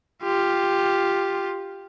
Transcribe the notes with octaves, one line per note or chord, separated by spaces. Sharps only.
F4 G4